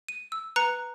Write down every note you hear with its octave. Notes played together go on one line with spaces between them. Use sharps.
D#7
E6
B4 A#5 F#6 C#7